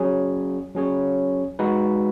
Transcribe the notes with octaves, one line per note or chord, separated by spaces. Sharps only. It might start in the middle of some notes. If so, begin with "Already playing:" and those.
Already playing: F#3 C#4 G#4 C#5
F#3 C#4 G#4 C#5
G#3 D#4 F#4 B4